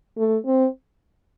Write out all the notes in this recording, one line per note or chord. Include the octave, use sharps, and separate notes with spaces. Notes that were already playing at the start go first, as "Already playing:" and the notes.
A3
C4